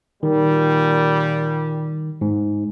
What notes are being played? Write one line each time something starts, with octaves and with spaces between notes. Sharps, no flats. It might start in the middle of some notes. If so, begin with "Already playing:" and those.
A#2 D#3 G3
G#2